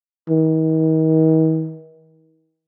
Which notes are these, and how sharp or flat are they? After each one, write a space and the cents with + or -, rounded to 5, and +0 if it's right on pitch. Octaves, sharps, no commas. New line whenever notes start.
D#3 +40